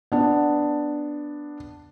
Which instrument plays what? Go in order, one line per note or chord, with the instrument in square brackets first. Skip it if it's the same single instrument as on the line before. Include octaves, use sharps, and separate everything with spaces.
[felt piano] B3 D4